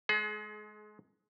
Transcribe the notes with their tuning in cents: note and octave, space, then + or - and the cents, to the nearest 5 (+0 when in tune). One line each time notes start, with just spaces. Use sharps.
G#3 +20 G#4 +40